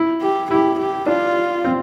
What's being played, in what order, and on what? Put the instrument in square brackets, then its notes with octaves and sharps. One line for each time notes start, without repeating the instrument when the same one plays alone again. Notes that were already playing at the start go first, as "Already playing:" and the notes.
Already playing: [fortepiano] E4
[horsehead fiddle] G4
[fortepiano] E4 [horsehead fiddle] G4
[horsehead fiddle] G4
[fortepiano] D4 [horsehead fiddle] F4
[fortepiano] C4